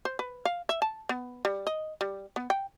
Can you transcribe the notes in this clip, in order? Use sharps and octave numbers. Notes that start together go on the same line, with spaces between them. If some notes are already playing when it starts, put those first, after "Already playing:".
C5
B4
F5
E5
A5
B3
G3
D#5
G3
B3
G5